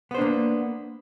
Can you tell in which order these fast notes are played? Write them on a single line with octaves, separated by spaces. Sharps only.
B3 C5 D4 A#3